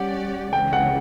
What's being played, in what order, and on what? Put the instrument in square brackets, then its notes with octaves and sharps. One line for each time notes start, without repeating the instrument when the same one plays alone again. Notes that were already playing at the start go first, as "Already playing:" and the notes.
Already playing: [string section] G3 C#4 G4 D5 [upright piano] F#5
[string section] C#2 C#3 E3 [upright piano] G5
[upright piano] F#5